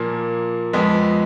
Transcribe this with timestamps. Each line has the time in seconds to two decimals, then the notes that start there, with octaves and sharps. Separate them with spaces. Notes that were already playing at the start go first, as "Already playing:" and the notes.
Already playing: A#2 F3 A#3
0.73 F2 F3 G#3 B3